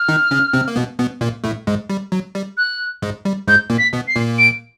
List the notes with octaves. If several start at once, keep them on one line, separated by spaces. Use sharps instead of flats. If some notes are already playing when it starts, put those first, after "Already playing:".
Already playing: F6
D#3 D#4
C#3 C#4
C3 C4
A#3
B2 B3
B2 B3
A#2 A#3
A2 A3
G#2 G#3
G3
F#3
G3
F#6
G#2 G#3
G3
G#2 G#3 G6
A#2 A#3
B6
B2 B3
C7
A#2 A#3
D7